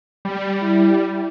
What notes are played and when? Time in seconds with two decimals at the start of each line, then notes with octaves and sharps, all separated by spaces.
0.25 G3
0.61 E4